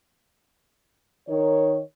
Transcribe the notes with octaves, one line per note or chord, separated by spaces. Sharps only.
D#3 D#4 A#4 C#5